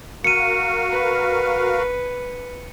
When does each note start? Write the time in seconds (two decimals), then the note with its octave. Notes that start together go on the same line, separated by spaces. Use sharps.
0.24 F#4 A#4 F5 C#7 D#7
0.92 B4